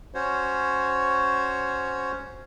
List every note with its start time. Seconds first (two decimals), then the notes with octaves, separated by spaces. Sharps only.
0.14 C#4 F#4 C5 C#5